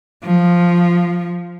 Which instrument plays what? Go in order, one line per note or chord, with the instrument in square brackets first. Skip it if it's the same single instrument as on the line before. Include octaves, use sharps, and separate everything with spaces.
[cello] F3